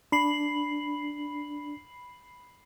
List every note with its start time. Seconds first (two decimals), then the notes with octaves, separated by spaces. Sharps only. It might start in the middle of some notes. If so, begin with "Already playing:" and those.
0.12 D4 B5 C7 F#7